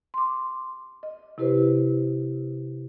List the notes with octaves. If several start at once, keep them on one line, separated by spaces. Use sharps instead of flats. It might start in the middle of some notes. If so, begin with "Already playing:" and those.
C6 D6
D#5
C3 E4 G4 B4 C5